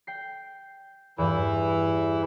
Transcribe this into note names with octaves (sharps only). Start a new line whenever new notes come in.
G5 C7
E2 G2 E3 E4